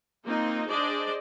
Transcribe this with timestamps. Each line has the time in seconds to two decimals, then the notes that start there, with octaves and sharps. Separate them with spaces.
0.24 A#3 C4 D#4 F4
0.67 D4 G#4 C5 D5 D#5